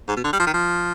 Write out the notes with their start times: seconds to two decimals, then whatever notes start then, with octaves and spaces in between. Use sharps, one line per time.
0.08 G#2
0.16 B2
0.24 D3
0.33 G3
0.39 F3
0.47 D#3
0.54 F3